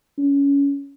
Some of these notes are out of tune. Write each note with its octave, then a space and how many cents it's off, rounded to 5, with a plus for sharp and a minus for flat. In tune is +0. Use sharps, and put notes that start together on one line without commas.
C#4 +20